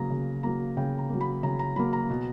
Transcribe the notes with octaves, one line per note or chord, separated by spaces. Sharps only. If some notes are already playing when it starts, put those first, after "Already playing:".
Already playing: C#3 F#3 A#3 A#5
C#3
F#3 A#3 A#5
C#3 G5
A#5
F#3 A#3
B5
C#3 A#5
A#5
F#3 A#3 B5
A#5
B2